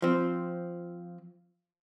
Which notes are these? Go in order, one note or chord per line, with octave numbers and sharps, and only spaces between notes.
F3 C4